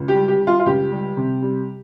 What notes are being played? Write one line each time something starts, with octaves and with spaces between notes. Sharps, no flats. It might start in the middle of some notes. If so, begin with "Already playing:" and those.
Already playing: C#2
G4
G3
G4
G3
F4
F4
C#2 G4
G3
C3
G3